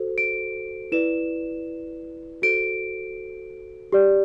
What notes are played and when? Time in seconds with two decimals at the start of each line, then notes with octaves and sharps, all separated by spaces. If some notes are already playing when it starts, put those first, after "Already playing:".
Already playing: F#4 A4 C5
0.18 D7
0.92 E4 B4 D5 E7
2.42 F#4 A4 C5 D7
3.92 G4 D5